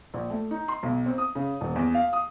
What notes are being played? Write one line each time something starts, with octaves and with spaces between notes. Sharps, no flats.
A#1
A3
D#4
C6
B1
C4
D#6
C#3
D#1
E2
F5
D#6